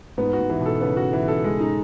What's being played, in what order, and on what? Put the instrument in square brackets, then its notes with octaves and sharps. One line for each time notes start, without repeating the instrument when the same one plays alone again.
[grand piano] G#2 [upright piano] B3
[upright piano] F#4
[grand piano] G#2
[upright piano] E3
[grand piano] B2
[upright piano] A4
[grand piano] C#3 [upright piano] B3
[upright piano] F#4
E3
A4
G#3
D#4